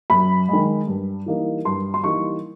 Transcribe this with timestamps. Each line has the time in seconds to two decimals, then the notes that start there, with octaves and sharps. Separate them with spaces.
0.10 F#2 B5
0.49 D#3 G#3
0.87 G2
1.26 E3 G3 A#3 D#4
1.65 G2 C6
1.94 C6
2.04 E3 G3 A#3 D#4 C#6